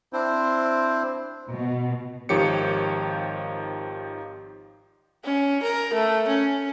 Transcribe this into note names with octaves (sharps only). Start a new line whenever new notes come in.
C4 D4 E4 C5
B2
G#1 D#3 F3 G4 C#5 C#7
C#4
A#4
A3
C#4